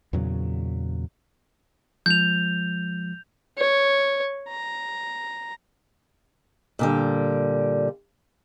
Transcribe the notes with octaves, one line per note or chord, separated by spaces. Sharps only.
E2 A#2 C#3 F#3
F3 G#3 G6 F7
C#5
A#5
A#2 D3 G3